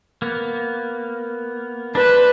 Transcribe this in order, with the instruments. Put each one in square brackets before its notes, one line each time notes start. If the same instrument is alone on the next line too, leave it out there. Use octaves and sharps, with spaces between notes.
[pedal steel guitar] A#3 B3
[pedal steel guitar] D4 C5 [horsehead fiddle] B4